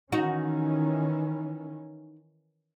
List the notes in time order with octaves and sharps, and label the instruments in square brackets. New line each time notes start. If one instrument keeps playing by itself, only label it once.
[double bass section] D#3 E3 C#4 [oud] D#4 F#4